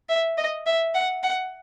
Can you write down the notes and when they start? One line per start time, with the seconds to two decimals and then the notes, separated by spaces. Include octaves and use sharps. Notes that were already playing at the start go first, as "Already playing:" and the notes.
0.09 E5
0.38 D#5
0.66 E5
0.94 F#5
1.23 F#5